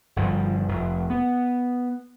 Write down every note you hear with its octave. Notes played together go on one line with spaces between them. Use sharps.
G1 G2 F3
F1
B3